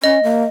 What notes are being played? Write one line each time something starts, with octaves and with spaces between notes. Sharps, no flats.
C#4 D#5
A#3